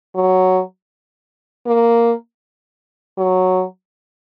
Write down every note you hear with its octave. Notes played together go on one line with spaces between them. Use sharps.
F#3
A#3
F#3